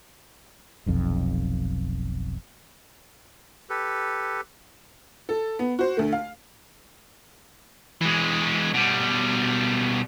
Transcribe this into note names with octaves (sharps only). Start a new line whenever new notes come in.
F1 B1 F2
G4 A4 B4
A4
B3
F#4 C5
D2 A3
F5
E3 G#3
B2 G3